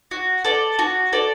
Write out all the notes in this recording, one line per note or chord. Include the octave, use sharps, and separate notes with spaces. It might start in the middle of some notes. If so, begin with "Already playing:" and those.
F#4
A4 D5
F#4
A4 D5